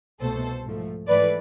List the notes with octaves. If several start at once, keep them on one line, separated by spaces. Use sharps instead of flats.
C2 B2 A3 A4 C5
G#2 F3 A3
G#2 E3 A3 B4 D5